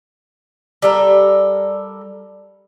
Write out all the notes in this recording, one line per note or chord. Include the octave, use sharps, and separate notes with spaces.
G3 A4 A#4